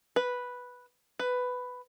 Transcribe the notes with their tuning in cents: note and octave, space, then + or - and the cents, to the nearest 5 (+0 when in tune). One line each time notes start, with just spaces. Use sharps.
B4 -5
B4 +10